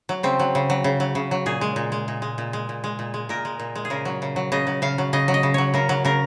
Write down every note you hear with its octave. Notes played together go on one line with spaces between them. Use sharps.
F#3
C#3 C4
F#3
C#3
F#3
C#3
F#3
C#3
F#3
A#2 G#4
G#3
A#2
G#3
A#2
G#3
A#2
G#3
A#2
G#3
A#2
G#3
A#2 A#4
G#3
A#2
G#3
G#4
C#3 A#4
F#3
C#3
F#3
C#3 D#5
F#3
C#3 F5
F#3
C#3 D#5
F#3
D#5
C#3
F#3 C#5
C#3 A#4
F#3
C#3 A#4